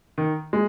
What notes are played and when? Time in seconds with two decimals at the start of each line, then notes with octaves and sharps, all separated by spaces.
0.18 D#3
0.53 G#3